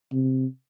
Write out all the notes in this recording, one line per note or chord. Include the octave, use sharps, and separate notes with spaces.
C3